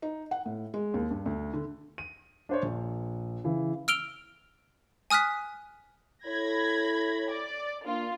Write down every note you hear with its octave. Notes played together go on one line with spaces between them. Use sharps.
D#4
F#5
A2
G#3
D#2
G2
D2
D3
D#7
D4 C5 C#5
A#1
C#3 E3
E6 F6 D7 F7 G7
G#5 D#6 F6 F#6 B6
E4 A4 C#5 B5 G#6 A#6
D5
A#3 D4 F4